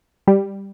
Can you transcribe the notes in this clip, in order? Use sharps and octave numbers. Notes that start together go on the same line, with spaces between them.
G3